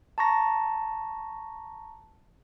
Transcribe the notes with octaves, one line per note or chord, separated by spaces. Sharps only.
A5 A#5 C#6 A#6